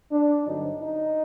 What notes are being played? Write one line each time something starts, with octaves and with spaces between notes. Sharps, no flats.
D4
G2 D3 F#3 C4 D#4
D#4